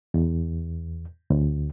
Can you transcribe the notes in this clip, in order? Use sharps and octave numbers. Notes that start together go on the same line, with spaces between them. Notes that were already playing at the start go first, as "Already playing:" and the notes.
E2
D2